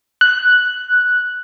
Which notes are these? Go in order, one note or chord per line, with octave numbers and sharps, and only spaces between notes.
F#6